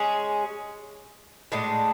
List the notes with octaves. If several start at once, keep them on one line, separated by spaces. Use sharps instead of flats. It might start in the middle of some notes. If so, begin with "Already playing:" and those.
Already playing: G#3 C#4 G#4
A2 G#3 D4